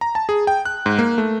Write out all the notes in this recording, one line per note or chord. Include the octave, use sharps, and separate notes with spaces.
A#5
A5
G#4
G5
F#6
G#2
A#3
A3